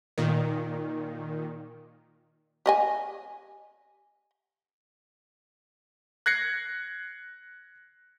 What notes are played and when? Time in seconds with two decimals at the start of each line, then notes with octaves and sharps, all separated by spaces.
0.18 A#2 D#3
2.66 G4 D#5 G#5
6.26 F#6 G#6 A#6 C7 C#7